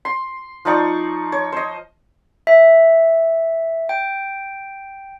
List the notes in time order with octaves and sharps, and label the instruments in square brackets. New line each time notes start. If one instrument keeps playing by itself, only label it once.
[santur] C6
F3 D#4 D5 C#6
C#5
C5 D#5
[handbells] E5
G5